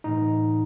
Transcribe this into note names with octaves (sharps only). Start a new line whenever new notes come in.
A2 E3 D#4